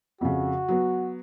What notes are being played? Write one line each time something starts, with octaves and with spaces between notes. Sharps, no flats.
F2 C#3 F#4
F#3 B3